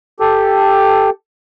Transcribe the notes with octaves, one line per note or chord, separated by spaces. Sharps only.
G4 A4